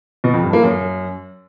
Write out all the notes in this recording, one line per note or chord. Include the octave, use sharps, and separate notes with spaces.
B2
F2
G2
A#3
F#2